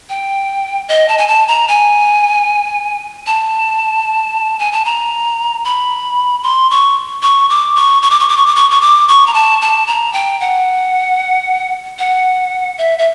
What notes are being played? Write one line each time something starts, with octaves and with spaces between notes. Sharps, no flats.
G5
D#5
A5
G#5
A5
A#5
G#5
A5
G#5
A5
A#5
B5
C6
C#6
C#6
D6
C#6
C#6
D6
C#6
D6
C#6
D6
C#6
C#6
D6
C#6
A#5
A5
A5
A#5
G5
F#5
F#5
E5
E5